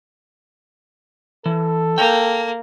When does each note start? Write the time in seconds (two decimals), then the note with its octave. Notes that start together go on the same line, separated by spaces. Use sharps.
1.46 E3 A4
1.98 A#3 G5